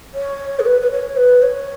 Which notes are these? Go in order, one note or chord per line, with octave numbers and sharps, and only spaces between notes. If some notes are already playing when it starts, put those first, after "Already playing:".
C#5
G#4
B4
B4
C#5
B4
C#5